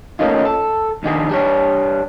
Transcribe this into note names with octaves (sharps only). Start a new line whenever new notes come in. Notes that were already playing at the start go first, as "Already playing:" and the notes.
A3 A#3 C#4 D#4 F4
A4
B1 D#3 D4 G#4
G3 D4 C#5